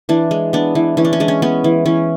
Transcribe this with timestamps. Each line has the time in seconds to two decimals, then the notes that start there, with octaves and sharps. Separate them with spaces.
0.09 E3 D4
0.31 G#3
0.53 B3 D4
0.75 E3
0.97 E3 C#4
1.05 D4
1.13 C#4
1.20 G#3 D4
1.28 C#4
1.42 B3 C#4
1.64 E3
1.85 E3 C#4